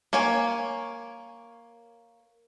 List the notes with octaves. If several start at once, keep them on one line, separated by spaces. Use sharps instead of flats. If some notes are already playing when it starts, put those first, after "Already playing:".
A#3 C#5 G#5